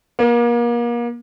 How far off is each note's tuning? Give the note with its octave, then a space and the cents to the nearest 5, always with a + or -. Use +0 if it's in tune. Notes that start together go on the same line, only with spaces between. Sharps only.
A#3 +35